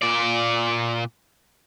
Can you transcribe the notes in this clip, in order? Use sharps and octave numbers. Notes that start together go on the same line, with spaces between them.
A#2 D5